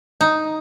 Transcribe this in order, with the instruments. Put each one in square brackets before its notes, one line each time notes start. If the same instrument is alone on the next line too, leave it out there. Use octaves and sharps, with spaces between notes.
[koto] D#4